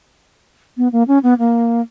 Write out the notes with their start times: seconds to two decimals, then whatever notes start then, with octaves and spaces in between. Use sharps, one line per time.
0.77 B3
0.92 A#3
1.08 C#4
1.23 B3
1.39 A#3